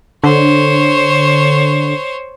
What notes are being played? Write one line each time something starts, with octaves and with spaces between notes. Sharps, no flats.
D3 C5 C#5